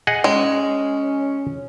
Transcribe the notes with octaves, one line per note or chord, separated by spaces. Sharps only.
G#4 D#5 F#5
G#3 C#4